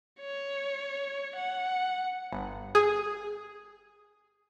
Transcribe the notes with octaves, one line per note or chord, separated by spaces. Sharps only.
C#5
F#5
G1
G#4